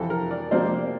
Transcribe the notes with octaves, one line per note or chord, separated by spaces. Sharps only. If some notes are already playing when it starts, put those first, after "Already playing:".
Already playing: F2 C3 E3 A4
A#4
D5
C3 F3 A#3 D4 C5